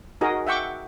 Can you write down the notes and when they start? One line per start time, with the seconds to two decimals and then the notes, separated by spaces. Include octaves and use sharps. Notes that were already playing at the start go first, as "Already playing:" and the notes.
0.21 D#4 F#4 G#4 A#4 D#5
0.47 E5 F#5 G5 C#6 D6